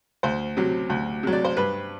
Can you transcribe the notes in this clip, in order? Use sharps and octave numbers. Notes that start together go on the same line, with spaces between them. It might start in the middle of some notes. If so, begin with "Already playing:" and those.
D2 C5
C3 F#3
D2
C3 F#3
D5
C5
G2 B4